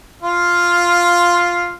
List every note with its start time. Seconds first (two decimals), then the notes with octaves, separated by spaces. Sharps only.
0.22 F4 F5